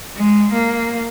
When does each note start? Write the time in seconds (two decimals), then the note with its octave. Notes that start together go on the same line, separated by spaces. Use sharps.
0.16 G#3
0.52 A#3